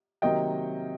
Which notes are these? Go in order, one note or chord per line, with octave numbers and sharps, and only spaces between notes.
C3 D#3 F#3 A#3 D#5 G5